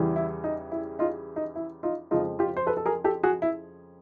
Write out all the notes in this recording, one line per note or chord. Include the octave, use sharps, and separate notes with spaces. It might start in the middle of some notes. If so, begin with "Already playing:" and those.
Already playing: E2 C#3 E3 G3
E4
D#4
E4
D#4 F4
D#4
E4
D#4 F4
F2 C#3 F3 G#3 D#4 F4
F4 G4
C5
A4 B4
A4
G#4 A#4
G4 A4
F#4 G#4
E4